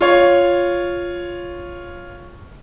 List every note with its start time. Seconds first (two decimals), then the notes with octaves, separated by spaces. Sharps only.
0.01 F4 C#5